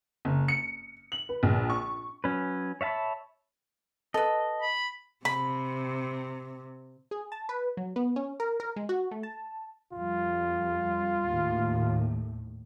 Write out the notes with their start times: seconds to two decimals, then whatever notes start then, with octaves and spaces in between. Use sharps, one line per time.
0.25 F#1
0.48 C#7
1.12 F#7
1.29 B4
1.43 A#1
1.70 C#6
2.24 F#3 C#4 B4
2.81 C#5 E5 F5 A5 B5
4.14 A4 B4 D#5
4.62 B5
5.25 C3 B5
7.11 G#4
7.32 A5
7.49 B4
7.77 F#3
7.96 B3
8.16 C#4
8.40 A#4
8.60 A#4
8.76 G#3
8.89 F#4
9.11 A3
9.23 A5
9.93 F2 G3 F4
11.26 D#2 A2